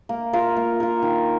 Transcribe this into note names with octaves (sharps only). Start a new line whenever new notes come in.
A#3
F4 A#4
A#3
F4 A#4
D#3